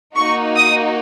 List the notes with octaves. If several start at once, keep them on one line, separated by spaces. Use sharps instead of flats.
A#3 D#4 F#4 C#6
D#6